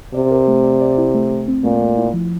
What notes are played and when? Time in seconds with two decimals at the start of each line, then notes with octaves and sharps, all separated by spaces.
0.14 C3 D5
0.31 A#4
0.48 A3
0.64 D5
0.81 D5
0.98 E4
1.14 A3
1.31 A3
1.48 C4
1.64 A#2 A3
1.81 A3
1.97 E4
2.13 F3